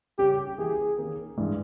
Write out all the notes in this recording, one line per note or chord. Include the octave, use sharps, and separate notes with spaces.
C#3 G3 C#4 G4
E3 A#3 E4 G4 G#4
D#3 A#3 C#4 G#4
G2 E3 G#3